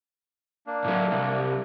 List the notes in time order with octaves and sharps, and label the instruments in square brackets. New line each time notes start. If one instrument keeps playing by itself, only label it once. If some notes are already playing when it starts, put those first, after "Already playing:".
[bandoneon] A#3 D4
[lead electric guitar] A2 F#3
C2